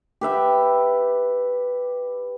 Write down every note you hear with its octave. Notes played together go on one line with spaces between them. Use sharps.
G4 B4 E5 G5